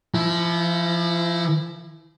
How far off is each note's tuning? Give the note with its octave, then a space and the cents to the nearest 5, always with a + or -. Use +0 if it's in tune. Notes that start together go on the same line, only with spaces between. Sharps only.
F3 -30 E4 +0